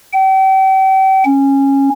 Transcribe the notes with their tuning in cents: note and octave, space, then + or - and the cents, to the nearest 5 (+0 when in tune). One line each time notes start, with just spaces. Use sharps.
G5 -40
C#4 -15